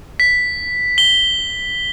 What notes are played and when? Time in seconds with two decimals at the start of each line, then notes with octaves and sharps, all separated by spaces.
0.20 B6
0.98 G7